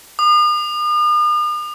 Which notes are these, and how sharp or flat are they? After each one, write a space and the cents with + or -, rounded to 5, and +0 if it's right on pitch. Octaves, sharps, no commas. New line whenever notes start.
D#6 -45